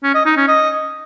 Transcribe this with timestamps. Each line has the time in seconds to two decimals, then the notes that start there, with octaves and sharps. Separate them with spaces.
0.03 C#4
0.14 D#5
0.25 D#4
0.37 C#4
0.48 D#5